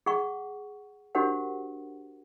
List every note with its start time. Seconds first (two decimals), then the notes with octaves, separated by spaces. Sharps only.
0.06 G#4 F#5 C#6
1.15 D4 F#4 G4 A#4 C5 F#5